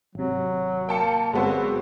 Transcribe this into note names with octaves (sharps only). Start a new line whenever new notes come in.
G#1 C3 F#3
A#3 G5 A5 C#7
G1 F#3 G#3 B3 C4 F#4